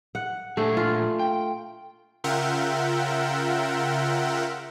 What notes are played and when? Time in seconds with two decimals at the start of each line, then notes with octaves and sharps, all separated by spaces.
0.15 F#5
0.57 A#2 A3 D4 G#4
0.77 F4
1.19 G5
2.24 C#3 F4 A#4 E5 F#5 G5